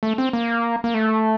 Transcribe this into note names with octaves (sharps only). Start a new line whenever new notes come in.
A3
C4
A#3
A#3
A3